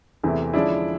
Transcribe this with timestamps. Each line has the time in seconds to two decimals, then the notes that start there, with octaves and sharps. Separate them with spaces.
0.23 E2 C3 E3 A3 C4
0.53 D3 F3 G#3 C#4 D4 E4